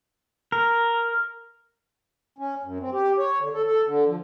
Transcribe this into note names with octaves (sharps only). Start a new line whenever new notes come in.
A#4
C#4
F#2
C4
G4
C#5
D3
A4
A4
D3
F3